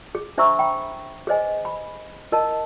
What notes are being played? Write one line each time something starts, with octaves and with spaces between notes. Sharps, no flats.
G#4
D4 C5 E5 A#5 C#6 E6
G5 B5
G#4 B4 C5 D#5 G#5
B5
E4 A#4 D#5 A5